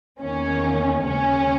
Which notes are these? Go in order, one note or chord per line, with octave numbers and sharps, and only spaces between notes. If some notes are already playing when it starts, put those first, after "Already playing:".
E2 D#3 A#3 C#4
D#2 C#3 G#3 C#4